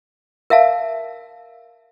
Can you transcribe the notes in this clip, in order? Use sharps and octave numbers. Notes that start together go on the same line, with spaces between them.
A#4 E5 F5 A5